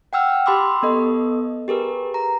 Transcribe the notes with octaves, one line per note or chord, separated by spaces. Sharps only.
F#5 G5 E6 F6
G4 B5 C6 D6 E6
B3 A4 D#5
G4 G#4 A#4 B4
A#5